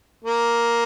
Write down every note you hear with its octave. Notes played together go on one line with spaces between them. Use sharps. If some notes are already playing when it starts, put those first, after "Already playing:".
A#3